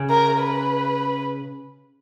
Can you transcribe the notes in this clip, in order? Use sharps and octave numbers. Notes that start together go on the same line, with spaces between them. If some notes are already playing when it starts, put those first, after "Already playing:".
Already playing: C#3
A#4
B4